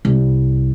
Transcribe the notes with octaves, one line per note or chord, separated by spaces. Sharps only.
C2